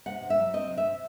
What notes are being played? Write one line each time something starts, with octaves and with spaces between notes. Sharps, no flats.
C3 F#5
C3
E5
F#3
C4 D#5
C3
E5
C3